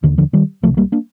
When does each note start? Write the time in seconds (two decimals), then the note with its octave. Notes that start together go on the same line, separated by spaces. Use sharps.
0.03 D#2 D3 D#3
0.18 D3 F3
0.33 D#3 G3
0.63 C2 F3 A3
0.67 C3
0.77 G3 A#3
0.92 A#3 D4